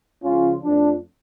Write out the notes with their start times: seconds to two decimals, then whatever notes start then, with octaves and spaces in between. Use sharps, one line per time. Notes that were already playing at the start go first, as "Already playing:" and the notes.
0.23 C#2 C#3 F3 C#4 F4
0.64 F2 F3 A3 D4